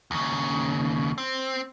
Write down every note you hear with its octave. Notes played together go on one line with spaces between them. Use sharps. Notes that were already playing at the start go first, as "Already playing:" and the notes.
D#2 C#3
C4